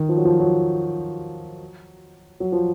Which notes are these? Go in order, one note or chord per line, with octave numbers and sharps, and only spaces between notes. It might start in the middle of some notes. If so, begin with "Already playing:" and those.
Already playing: D#3
F3
F#3
F3
F#3
F#3
F3